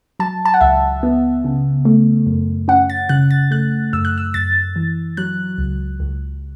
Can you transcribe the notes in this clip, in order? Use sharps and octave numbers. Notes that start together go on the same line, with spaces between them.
F#3 A5
A5
F#5
C#2 E5
B3
C#3
A3
F#2
C#4 F#5
A6
C#3 F#6
A6
A3 F#6
F#2 E6
F#6
E6
F#2 A6
E3
F#3 F#6
C#2
C#2